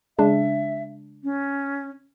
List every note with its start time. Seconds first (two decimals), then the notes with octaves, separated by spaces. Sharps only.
0.19 C#3 G#3 D4 E5
1.24 C#4